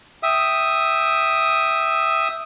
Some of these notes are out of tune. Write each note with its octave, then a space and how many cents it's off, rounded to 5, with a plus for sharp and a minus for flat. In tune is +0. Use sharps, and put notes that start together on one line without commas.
E5 +0 G5 +0 D#6 +0